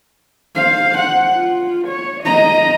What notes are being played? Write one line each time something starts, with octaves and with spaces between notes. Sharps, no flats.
C5 F5
F#5
F4
C#5
D#5 A#5